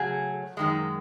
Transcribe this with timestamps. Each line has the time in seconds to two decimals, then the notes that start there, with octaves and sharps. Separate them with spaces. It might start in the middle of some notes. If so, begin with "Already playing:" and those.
Already playing: C#3 F#3 A3 G#4
0.57 F#2 D#3 G#3